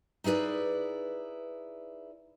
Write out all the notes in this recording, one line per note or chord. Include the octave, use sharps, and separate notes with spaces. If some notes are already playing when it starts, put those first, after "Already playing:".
D#4 E4 G#4 B4 D5